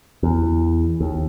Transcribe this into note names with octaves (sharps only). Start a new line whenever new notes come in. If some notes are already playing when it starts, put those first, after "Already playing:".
E2
D#2